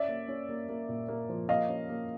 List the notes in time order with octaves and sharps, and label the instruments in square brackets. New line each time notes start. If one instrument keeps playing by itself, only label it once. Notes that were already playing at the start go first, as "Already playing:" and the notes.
Already playing: [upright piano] C#4 D5 E5
A#3
C#4
A#3
A#3
A#2
A#3
F3
A#3 D#5 F5
C#4
A#3